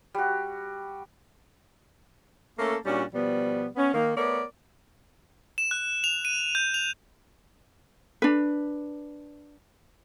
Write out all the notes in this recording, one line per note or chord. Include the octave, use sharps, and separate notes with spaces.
G3 F#4
A3 A#3 C#4 A4
A#2 G3 C#4 D4 F#4
B2 F3 G3 B3
B3 C#4
D#3 A#3
A3 B3 A#4 C#5 D5
E7
F#6
F7
D#7
G6
F7
D4 B4